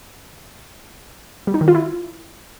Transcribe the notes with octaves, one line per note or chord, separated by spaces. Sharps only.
G3
D#4
D#3
F4
E4